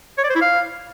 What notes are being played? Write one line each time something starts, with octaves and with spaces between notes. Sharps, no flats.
C#5
D5
C5
E4
F5